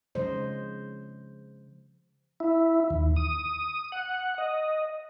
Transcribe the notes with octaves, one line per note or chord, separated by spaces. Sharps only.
C#3 F3 G#3 C5 D#5
E4
D#2
D#6
F#5
D#5